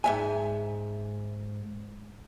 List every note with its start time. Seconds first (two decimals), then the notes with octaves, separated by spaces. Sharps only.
0.04 G#2 E5 G#5